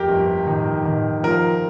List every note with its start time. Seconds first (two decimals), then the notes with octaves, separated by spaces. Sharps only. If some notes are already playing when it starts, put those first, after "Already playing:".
Already playing: F2 G4 A#4
0.09 G1
0.47 D#3
0.85 D#3
1.23 F3 A#4